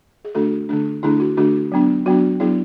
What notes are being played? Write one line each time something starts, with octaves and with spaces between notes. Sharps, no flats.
G#4
D3 A3 D4 F#4 A4
D3 A3 D4
D3 A3 D4 E4 G#4
F#4
D3 A3 D4 F#4
F#3 B3 D4
F#3 B3 D4 F#4
F#3 B3 D4 E4 G#4